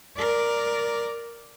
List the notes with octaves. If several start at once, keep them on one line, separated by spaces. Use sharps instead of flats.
A#4 D5